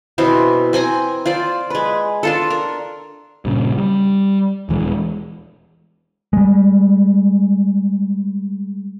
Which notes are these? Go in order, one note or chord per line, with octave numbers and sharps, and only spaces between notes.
B2 E3 B3 C4
C4 G#5 A#5 C6
F4 C5 D5
G#3 B4
D4 F4 A4
A#4
G2 A#2 C#3
G3
D#1 E3 G#3
G3 G#3